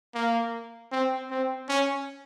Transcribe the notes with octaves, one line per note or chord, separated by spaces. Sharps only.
A#3
C4
C4
C#4